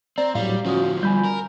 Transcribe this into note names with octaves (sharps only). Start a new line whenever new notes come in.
C4 D5 A#5
A2 F#3 G3 F5
D2 F3 C#4 F#4 D#6
G3 G#5 B5 G6
A#4